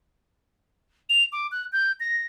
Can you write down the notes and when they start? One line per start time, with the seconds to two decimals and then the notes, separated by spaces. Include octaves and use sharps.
1.10 F7
1.32 D6
1.52 F#6
1.72 G6
2.00 A#6